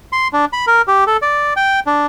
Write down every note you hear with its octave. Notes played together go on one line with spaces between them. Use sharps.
C6
D4
B5
A#4
G4
A4
D5
G5
D4